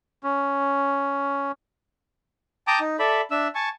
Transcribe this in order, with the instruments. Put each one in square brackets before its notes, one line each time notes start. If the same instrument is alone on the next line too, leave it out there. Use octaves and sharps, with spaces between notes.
[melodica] C#4
[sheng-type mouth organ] G5 A5 A#5 D6 D#6 G6
D#4
A4 D5 E5 B5
D4 E5 E6
G#5 A5 C#6